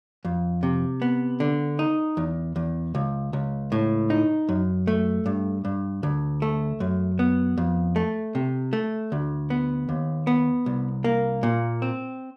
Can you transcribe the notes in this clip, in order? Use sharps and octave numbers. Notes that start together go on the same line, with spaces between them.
F2
C3
B3
D3
D#4
E2
E2
C#2
C#2
A2
D#4
F#2
A3
G2
G2
D2
A3
F#2
B3
F2
A3
C3
A3
D2
B3
D#2
B3
C2
A#3
A#2
C4